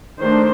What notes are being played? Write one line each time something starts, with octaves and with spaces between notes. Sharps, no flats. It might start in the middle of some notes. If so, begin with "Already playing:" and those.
D#3 A3 D4 C5